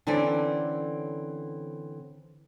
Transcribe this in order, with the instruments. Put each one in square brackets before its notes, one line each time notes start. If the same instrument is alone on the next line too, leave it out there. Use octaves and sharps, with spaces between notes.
[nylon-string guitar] D3 E3 C4 C#4 A4 D5